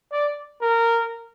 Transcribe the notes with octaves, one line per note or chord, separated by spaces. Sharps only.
D5
A#4